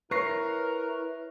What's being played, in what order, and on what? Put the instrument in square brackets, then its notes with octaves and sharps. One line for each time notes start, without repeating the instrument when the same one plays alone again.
[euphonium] E4 [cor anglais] A#4 [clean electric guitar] B4 C#5 [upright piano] C#6 A#6 C7